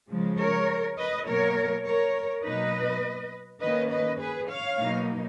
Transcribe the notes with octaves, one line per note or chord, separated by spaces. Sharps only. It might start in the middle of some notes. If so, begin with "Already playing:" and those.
C#3 F3 G#3
A#4 C#5
B4 D#5
B2 F#3 A#3 A#4 C#5
A#4 C#5
B2 F#3 A#3 D#4 B4 D#5
D#3 A#3 C#4 B4 D#5
B4 D#5
G#4 B4
C#5 F5
B2 F#3 A#3 D#4